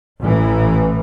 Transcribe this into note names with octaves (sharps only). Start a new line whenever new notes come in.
A1 E3